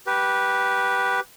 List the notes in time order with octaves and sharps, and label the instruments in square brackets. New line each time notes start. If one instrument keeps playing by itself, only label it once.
[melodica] G4 B4